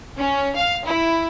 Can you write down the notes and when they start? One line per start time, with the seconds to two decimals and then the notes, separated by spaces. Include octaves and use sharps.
0.17 C#4
0.56 F5
0.85 E4